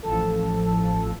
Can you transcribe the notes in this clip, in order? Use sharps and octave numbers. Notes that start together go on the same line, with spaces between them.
A1 F3 A4